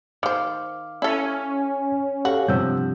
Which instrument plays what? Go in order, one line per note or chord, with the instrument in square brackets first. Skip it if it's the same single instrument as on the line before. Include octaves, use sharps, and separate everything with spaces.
[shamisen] D#3 C5 [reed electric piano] F5 D6 F6
[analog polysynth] C#4 [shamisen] E4 A4
[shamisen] F#4 [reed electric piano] G4 A4 F5
[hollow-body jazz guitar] G2 C3 F3 [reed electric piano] F#5 E6 G6